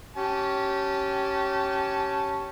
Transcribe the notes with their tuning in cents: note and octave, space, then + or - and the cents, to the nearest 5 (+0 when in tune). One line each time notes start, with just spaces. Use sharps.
C#4 +0 G4 -25 A5 +0